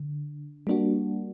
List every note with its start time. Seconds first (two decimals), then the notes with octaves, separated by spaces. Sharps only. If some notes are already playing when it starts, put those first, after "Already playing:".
Already playing: D3
0.67 G3 A#3 D4 F#4